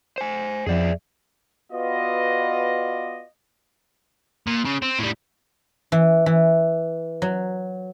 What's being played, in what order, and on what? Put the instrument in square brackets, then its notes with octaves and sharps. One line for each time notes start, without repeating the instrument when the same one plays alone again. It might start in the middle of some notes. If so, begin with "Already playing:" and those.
[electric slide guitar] C5 G#5
[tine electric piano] F2 F3 [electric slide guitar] G#4 D5 E5
[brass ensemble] B3 F4 F#4 B4 D5 D#5
[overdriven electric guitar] A#2
C#3
C4
A2 G3
[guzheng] E3
E3
F#3